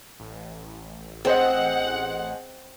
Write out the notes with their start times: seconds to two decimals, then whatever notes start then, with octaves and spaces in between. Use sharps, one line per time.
0.19 A1
1.25 C4 G#4 C5 D#5 F#5